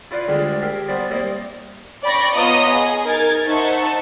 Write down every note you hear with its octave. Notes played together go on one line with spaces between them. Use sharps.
E4 F4 B4 D5 F5
D2 G3 G#3 D4 F4
G4 A#4 E5 F5 G#5
G3 B3 C5 D5
G3 A#3 C4 D#4 E4 C5
D5 G5 B5 C#6 A#6
B3 F4 C#5 D#5 A#5 D#6
G#4
D#4 A#4 G#6 A6
D#4 C5 E5 F#5 A5 C#6